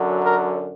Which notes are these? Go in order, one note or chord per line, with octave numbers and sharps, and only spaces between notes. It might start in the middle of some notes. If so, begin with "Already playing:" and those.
Already playing: F#2 D3 F#3
A#4